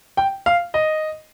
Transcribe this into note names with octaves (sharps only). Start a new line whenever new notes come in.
G5
F5
D#5